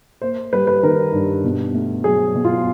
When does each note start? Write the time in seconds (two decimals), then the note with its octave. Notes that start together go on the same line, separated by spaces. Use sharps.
0.22 A#3 C5
0.53 G3 B4
0.67 B4
0.83 D#3 A#4
1.13 G2
1.44 B2
1.74 A3
2.04 F#3 G#4
2.35 B2
2.45 F4